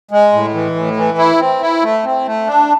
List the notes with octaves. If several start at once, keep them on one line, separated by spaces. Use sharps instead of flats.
G#3
A2
E3
A2
E3
E4
C4
E4
A3
C4
A3
D4